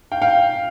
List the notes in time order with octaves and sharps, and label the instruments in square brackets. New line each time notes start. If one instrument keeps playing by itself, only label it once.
[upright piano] F5 G5
F5 G5